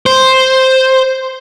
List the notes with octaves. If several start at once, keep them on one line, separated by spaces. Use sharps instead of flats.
C5